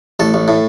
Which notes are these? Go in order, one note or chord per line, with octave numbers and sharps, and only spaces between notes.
A1 A4
A1
A2